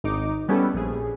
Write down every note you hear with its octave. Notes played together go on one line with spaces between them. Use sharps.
G#1 D#4 D6
G3 B3 C#4 E4 G4 A4
A#1 G#4